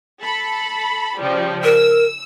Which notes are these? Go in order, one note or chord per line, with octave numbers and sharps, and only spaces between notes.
A4 B5
C#3 F3 G3
A#4 E6